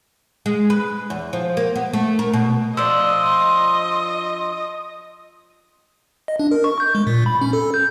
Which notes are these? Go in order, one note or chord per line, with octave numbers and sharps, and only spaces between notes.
G#3
B4
E2
F3
A#3
B3
A3
A#4
B2
F3 D4 D#5 C6 E6
D#5
D4
A#4
C#6
G6
G#3
A#2
B5
C#4
A4
G6